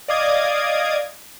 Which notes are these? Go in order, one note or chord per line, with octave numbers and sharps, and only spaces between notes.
D5 D#5 F5 D6 D#6 G#6